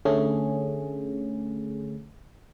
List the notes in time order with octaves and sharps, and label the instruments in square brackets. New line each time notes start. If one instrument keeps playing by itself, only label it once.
[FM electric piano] D3 A3 C#4 G#4